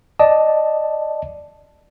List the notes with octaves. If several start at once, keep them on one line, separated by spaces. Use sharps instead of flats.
D5 D#5 A5